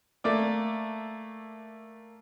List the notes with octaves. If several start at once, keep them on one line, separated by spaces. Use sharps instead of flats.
A3 A#3 D5